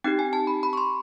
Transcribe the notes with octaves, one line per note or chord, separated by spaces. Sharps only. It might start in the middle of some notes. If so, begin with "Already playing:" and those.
C4 D#4 G4 G5
G#5
A5
B5
B5
C#6
C6